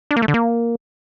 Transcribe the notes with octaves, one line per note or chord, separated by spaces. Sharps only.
D4
A#3
A3
D3
A#3